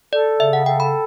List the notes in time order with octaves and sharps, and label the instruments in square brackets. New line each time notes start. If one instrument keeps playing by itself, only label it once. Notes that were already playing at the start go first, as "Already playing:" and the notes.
[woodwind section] A4 [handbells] D5
[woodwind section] C#3 [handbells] E5
[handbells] F#5
[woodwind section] A4 [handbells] G5
[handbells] B5